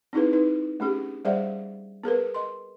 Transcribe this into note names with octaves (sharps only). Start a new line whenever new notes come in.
C4 D#4 E4 G#4 B4
D#4 B4
A3 C#4 G4 G#4
G3 G#4 C5 D5 E5 F#5
B3 G#4 A#4 B4
D#5 C6